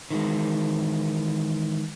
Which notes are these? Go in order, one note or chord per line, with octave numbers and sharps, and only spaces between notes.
D#3 E3 G#3